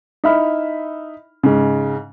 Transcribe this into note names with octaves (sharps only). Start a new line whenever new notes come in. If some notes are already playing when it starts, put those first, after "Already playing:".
D#4 E4 E5 B5 F6
G#2 C#3